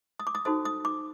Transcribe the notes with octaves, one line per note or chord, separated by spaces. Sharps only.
D#6
D6
D#6
D#4 F#4 A4 C5 D#6
D#6
D6